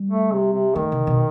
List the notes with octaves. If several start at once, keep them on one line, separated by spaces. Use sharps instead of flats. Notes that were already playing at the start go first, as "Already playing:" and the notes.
Already playing: G3
A3
C3
C3
D#3 A3
C3
B2